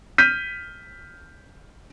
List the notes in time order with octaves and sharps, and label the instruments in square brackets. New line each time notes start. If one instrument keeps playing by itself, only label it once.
[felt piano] F6 G6 B6 D#7